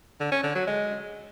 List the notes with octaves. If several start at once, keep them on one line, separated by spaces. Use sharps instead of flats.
D3
C#4
D3
F#3
G#3